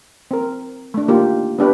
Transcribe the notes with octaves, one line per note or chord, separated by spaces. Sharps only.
C4 A#4
A3 D4
A#3 D#4 F4 G4
B3 D4 G4 B4